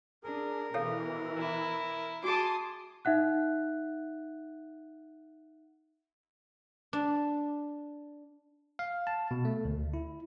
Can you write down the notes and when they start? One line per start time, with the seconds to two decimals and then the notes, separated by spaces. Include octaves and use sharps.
0.24 D4 G#4 A#4
0.74 B2 E3 A4 C#5 F5
1.37 E4
2.24 F#4 G#4 G#5 A5 C6 D6 D#6
3.05 D#4 E5 F#5 F#6
6.93 D4
8.79 F5
9.07 A5
9.31 B2
9.45 A3
9.65 D2
9.94 E4